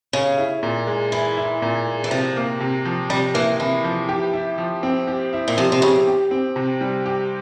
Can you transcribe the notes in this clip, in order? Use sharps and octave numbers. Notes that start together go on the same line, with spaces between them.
C#3 G#4
E4
A#2
G#3
E3 G#4
E4
A#2
G#3
E3
C3 F3
A#3
C3
F3
C3 G3
E3 A#3
C3 E3
F3
G4
E4
F3
C4
G4
E4
A#2
C3 F3
C3
C#3 C4
G4
C4
C3
G3
G4